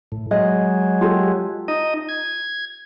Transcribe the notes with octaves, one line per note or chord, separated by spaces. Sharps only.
A2
F#3 G#3 D#5
F4 G4 A4
D#4 D#5
G#6